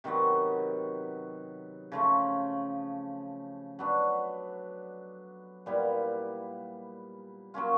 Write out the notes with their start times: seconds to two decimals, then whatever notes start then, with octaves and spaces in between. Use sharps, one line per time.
0.04 C3 D#3 F#3 B3
1.92 C#3 F3 A3
3.79 F#3 B3 D4
5.66 A#2 G3 B3 E4
7.54 F#3 A#3 C#4 F4